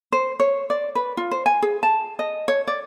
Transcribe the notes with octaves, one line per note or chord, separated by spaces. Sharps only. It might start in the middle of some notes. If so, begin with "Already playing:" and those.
C5
C#5
D5
B4
F4
C5
G#5
G#4
A5
D#5
C#5
D5